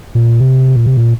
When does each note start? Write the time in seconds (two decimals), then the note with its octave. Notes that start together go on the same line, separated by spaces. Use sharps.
0.15 A#2
0.40 C3
0.76 A#2
0.86 C3
0.97 A#2